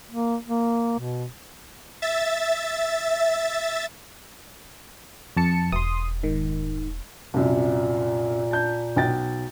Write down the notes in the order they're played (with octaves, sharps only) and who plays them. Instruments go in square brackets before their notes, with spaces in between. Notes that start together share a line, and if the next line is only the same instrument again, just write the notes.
[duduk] A#3
A#3
B2
[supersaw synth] E5 A6
[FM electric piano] F2 A5 C#7
[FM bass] E1 [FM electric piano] C6 D#6
[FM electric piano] G#2 D#3
[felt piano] C2 F#2 [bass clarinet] A#2
[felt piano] A5 G6
B1 G5 A6